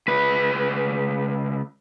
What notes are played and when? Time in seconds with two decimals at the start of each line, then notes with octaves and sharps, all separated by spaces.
0.08 C#2 B4